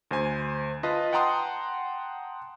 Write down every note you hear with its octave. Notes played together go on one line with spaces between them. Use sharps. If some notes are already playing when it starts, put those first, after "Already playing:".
D2 C5 G#5
F4 B4 D#5 A5
F#5 G5 A5 A#5 C6 D#6